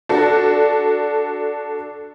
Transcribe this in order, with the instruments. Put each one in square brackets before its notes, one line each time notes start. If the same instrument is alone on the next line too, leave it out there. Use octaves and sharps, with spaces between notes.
[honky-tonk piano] D4 F#4 A4